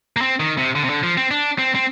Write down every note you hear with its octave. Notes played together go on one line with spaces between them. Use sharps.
A#3
C4
D#3
C3
D3
C3
D3
F3
C4
D4
C4
C4